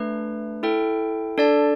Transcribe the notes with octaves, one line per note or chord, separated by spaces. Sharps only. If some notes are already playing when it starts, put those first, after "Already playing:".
Already playing: A3 D4 B4
E4 A4 G5
D4 A4 D5 A5